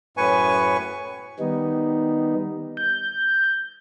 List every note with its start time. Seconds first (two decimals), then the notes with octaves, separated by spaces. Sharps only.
0.17 F#2 A2 B4 G#5 C#6
1.39 D#3 G3 B3 D#4
2.77 G6